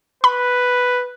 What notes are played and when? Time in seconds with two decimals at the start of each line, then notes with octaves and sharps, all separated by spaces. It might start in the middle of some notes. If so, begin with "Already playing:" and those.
0.24 B4 B5